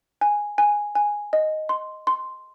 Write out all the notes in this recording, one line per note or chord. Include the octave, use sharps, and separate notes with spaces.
G#5
G#5
G#5
D#5
C6
C6